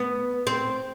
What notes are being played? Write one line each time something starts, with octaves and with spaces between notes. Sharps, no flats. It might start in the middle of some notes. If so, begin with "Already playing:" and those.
Already playing: B3
C4